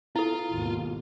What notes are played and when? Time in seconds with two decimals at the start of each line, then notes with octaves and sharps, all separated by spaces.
0.16 E4 F4 A4
0.52 G#1 D#2 B2